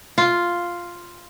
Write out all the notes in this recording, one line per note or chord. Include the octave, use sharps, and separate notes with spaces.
F4